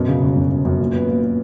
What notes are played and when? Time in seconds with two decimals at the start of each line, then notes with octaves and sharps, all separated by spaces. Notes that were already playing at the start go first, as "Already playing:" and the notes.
Already playing: F#2 B2
0.08 C#3
0.21 G1
0.36 F#2
0.51 G1
0.65 F#2
0.80 A#2
0.93 B3
1.09 A#2
1.23 B3